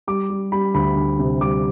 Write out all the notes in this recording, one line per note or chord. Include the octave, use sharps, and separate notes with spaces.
G3 D6
G3
G3 B5
D2 B5
D2
C3
G3 D6